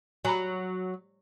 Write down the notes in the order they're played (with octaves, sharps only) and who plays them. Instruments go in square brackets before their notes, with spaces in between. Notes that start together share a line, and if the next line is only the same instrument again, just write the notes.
[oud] F#3 [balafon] G#5 A#5 B5